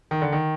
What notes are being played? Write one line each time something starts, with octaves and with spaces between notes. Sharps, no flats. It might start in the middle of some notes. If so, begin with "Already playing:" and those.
D#3
D3
D#3